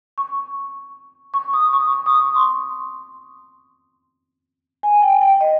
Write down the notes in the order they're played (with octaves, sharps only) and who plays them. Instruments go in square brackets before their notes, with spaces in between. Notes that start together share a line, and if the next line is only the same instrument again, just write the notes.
[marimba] C#6
C#6
D#6
C#6
C#6
D#6
C#6
C6
G#5
G5
G5
D#5